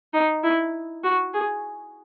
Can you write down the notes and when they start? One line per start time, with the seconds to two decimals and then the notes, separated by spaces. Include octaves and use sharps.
0.13 D#4
0.44 E4
1.04 F#4
1.33 G#4